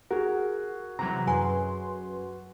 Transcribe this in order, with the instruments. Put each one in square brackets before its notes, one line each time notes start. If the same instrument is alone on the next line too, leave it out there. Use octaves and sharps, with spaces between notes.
[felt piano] F#4 G#4 [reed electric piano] A#4
[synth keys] C3 E3 F#3 [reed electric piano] A#5
[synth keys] F#2 B4 C6 [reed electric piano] F#3 [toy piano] G#5